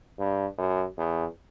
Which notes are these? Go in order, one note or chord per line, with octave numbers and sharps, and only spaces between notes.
G2
F#2
E2